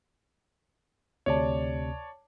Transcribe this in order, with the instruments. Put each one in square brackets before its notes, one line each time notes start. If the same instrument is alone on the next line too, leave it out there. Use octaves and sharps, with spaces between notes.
[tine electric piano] D2 C3 [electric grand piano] C#5 D5 A5